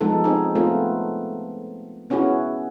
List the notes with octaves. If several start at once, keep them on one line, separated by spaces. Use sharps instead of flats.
F3 G#3 B3 D#4 A4
C4 D#4 G#4
A3 B3 C4 F4
B3 C#4 E4 F#4 G#4